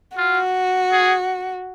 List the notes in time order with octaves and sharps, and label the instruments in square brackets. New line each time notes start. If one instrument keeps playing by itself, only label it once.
[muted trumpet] F4 [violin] F#4
[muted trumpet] G#4